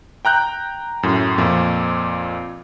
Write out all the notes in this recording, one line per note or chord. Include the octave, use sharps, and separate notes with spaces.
G5 A#5 F#6 G6
F#2 A2
F2 A#2